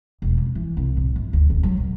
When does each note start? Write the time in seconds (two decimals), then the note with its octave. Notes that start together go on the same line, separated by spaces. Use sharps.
0.22 E1
0.38 C#3
0.55 E3
0.77 C2
0.97 A2
1.16 G1
1.33 D2
1.50 D#1
1.63 F#3
1.77 A#1